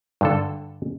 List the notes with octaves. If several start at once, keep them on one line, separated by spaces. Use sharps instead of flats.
G2 D3 A4